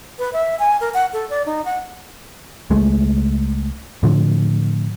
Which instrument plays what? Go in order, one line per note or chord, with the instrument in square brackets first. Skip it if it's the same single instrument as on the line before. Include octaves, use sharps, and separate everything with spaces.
[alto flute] B4
E5
G#5
A#4
F#5
A4
D5
D#4
F#5
[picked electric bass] C#2 G#3 A3
A2 D3 F3